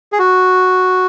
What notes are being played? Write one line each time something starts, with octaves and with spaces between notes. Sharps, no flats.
G#4
F#4